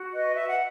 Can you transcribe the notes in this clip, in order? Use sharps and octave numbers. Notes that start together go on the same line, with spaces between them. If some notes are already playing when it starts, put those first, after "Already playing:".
Already playing: F#4
B4 D#5
E5
F#5